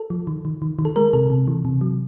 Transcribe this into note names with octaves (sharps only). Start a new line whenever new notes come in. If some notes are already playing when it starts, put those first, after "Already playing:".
Already playing: A4
F3
D#3
D#3
D#3
D#3
A4
G#3 A#4
C3 A4
C3
E3
C3
F#3